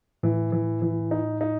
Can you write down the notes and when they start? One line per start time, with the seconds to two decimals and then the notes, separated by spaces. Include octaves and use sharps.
0.23 A2 E3
0.52 E3
0.82 E3
1.11 D#4
1.41 D#4